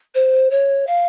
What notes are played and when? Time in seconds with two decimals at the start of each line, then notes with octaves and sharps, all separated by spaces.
0.15 C5
0.50 C#5
0.87 F5